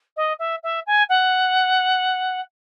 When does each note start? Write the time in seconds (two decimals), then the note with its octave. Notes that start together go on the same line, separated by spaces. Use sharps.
0.17 D#5
0.39 E5
0.63 E5
0.87 G#5
1.09 F#5